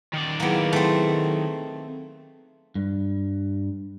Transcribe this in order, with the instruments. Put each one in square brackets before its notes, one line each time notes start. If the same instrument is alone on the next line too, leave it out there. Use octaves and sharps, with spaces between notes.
[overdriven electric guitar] D#3 D5
[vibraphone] F#3 E4 G#4 [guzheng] A#3 B3
[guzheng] A3 C4
[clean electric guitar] G2